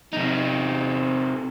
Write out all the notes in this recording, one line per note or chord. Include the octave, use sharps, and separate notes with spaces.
C3 D#4